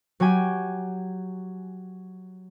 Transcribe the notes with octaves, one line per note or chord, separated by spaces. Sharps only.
F#3 F#4 G4 G#5